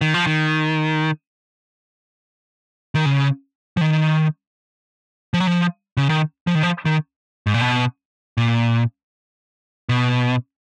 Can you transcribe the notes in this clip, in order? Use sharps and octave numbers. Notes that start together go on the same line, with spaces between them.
D#3
F3
D#3
D#3
C#3
F3
D#3
F3
F#3
F3
C#3
D#3
F3
D#3
F3
D#3
G#2
A#2
B2
A#2
B2